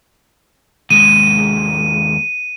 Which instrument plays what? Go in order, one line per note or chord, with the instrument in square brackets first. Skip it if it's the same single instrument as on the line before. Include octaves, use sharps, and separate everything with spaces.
[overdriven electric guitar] D#2 G#3 [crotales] D#7